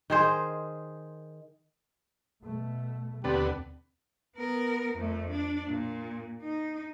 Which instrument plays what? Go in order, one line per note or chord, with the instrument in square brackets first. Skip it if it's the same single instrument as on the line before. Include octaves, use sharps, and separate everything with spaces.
[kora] D#3 G#4 C5
[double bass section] B2 A3
[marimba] D#2 C4 A6 [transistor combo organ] D3 B3 [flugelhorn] G4
[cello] B3 A#4
F2 A3
D4
A#2
D#4